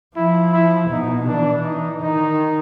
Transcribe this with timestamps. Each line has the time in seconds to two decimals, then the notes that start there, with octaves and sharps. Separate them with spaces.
0.16 F3 E4
0.52 E4
0.90 B2 D#4
1.27 E3 D4
1.64 D#4
2.02 D#3 D#4